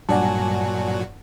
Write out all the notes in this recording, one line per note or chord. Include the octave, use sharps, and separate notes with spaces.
G2 A#2 F#3 F#4 D5 F#5 G#5 A5